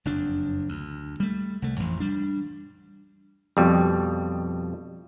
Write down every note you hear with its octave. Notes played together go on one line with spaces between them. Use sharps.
F#1 F2 D4
D2
G3 A3
C2 A3
A1 F2 E3
G3 D4
F2 B2 G3